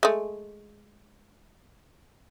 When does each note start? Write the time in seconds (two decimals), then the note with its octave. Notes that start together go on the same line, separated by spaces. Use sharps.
0.03 G#3 A3